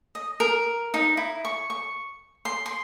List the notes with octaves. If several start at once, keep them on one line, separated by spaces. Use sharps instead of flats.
D#5
A#4
D#4
E4
C#6
C#6
C6
C6